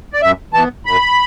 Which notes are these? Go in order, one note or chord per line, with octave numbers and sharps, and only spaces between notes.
D5
F#2 E5
E3 A5
B3
F#2 B5